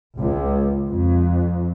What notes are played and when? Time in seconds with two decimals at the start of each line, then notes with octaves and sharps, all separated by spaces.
0.16 C#2
0.86 F2